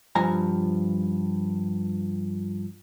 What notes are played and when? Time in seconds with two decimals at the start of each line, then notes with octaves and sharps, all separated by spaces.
0.15 G2 F3 G#5 A#5